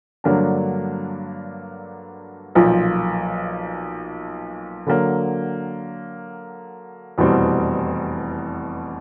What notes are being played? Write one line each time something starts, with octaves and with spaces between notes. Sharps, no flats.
G2 D3 F#3 A#3 D4
B1 A#2 F3
D3 F#3 A#3
F1 E2 B2 G3 C4